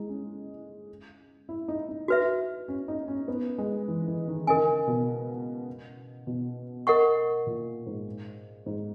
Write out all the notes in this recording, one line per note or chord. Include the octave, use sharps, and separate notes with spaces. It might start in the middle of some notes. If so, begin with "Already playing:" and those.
Already playing: G#3 E4
C#4
E4
D#4
D#4
F#4 B4 E5
C#4
D#4
C#4
B3
G#3
E3
E3
D#3
C#3 A#4 D#5 G#5
B2
B2
A#4 D#5 F#5 C#6
A#2
G#2
G#2